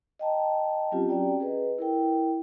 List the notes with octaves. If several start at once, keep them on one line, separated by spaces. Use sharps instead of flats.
D#5 G5 A5 A#5
F#3 C4 C#4 F4 G4
C#4 F#4 D5 G5 A#5
G#4 B4 D#5
E4 A#4 G5